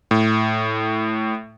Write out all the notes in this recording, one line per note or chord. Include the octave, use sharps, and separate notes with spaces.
A2